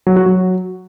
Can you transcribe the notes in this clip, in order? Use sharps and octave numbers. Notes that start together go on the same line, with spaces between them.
F#3
F#4
F#3